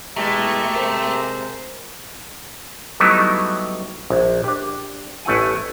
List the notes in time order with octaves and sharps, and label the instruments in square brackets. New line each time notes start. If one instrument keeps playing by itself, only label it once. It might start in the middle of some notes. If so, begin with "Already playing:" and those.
[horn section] B2 E3 G#3 [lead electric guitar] A3 [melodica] G4 E5 A#5
[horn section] C3 G#3 C5 [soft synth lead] A#4
[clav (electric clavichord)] F#3 G3 A3 B3 D#4 E4
A#1
D4 G4
A1 A3 E4 F#5 G#5